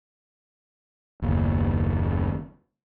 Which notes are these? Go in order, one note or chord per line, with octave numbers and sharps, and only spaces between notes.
F#1 D#2